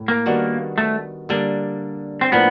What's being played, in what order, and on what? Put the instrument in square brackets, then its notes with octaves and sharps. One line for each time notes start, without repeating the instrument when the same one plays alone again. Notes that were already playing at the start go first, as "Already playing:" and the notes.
Already playing: [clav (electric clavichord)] A2
[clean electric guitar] A#3
[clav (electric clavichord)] D#3 G3 B3 D4 F#4
[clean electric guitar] A3
[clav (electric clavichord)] D3 G3 A#3 D4
[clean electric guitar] C4
[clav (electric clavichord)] A2 F3 A#3 D4 [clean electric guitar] B3